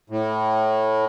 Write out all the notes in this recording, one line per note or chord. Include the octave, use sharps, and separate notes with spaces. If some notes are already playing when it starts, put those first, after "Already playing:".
A2